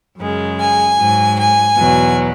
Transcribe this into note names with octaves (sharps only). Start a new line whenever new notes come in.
F#2 C#3 G#3
G#5
G#2 F#3
G#5
E2 B2 F#3